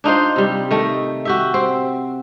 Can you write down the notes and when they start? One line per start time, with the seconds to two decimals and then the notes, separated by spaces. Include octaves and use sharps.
0.04 D4 D#4 F4 C5
0.36 C3 G3
0.71 D#3 A3
1.25 F#4 G4 E5
1.54 C4